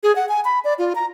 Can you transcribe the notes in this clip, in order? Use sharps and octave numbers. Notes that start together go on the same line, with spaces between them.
G#4
F#5
G#5
B5
D5
F4
A#5